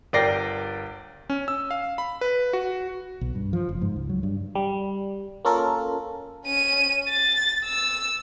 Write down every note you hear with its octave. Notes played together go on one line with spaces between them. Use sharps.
G1 A#4 D5 G5 A#6 C7
C#4
E6
F5
B5
B4
F#4
B1
G2
F3
F#1
G#2
C#2
F#3
G2
G3
A#3 C#4 F4 A4 A#4
C#4 D#7
A6
E6